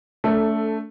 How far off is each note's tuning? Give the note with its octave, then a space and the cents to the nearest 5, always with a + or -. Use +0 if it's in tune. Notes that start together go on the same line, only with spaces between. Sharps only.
A3 +0 D4 -45 A4 +10